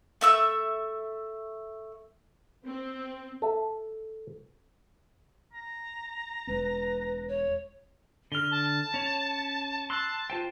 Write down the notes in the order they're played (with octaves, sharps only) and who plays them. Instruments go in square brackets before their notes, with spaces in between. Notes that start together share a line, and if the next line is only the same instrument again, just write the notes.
[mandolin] A3 E5 E6
[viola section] C4
[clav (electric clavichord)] A4 E5
[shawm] A#5
[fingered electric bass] E1 G#3 C4 [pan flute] B4
[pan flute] C#5
[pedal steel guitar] D3 F6 [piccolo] G7
[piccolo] A5
[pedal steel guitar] C#4 C#5
[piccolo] A5 [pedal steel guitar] C6 E6 F#6
[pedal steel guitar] F4 C5 G5